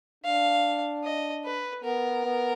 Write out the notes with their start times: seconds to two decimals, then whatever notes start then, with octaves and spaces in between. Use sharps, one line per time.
0.24 D4 F5
1.04 D#5
1.45 B4
1.84 B3 A#4
2.25 B3